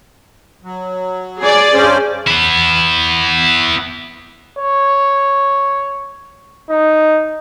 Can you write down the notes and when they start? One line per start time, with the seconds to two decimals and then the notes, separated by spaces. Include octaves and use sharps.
0.63 F#3
1.41 G#4 D5
1.74 G2 C#4 C5
2.28 B3 E4
4.59 C#5
6.70 D#4